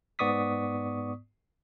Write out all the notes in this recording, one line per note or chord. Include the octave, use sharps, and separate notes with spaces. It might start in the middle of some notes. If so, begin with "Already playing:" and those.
G#2 B3 D5 C#6 D#6 B6